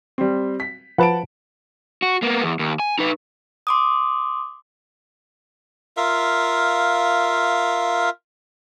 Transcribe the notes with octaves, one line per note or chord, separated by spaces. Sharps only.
G3 C4
B6
F3 B4 F#5 A5 D7
F#4
A#3 B3
E2
D#2
G#5
D#4 B4
C6 D6 D#6
F4 A#4 E5 F5